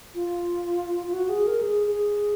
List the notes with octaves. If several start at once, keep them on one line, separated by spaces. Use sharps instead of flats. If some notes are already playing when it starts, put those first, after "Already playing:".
F4
F4
F#4
G#4
A#4
G#4
G#4